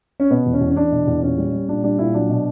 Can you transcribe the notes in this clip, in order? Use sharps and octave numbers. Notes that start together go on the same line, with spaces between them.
C#4
B2 B3
E2
C#4
E2
C#4
E2 D4
B2
E2
A#2 C#4
G3
G3
A#2 D4
G3 D4
A#2 E4
F#3 D4
B2